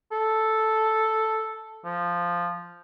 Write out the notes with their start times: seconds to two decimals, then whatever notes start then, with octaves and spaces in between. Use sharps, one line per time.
0.12 A4
1.85 F3